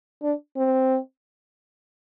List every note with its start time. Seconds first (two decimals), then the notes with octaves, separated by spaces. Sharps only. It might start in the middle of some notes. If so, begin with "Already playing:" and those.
0.22 D4
0.56 C4